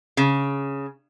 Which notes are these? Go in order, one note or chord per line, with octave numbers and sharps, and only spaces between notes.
C#3